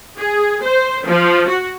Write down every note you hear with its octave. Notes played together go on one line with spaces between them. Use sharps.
G#4
C5
F3
F#4